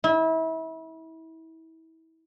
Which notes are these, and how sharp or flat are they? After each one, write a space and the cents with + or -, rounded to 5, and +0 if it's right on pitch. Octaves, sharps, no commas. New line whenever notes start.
E4 -30